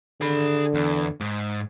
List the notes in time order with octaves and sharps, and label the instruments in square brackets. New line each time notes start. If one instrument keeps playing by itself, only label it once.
[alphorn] D3 [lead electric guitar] G#4 B5
[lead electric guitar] E2
G#2